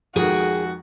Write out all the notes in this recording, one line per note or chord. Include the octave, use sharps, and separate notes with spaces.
F2 D#3 G#3 F#4 G#4 G5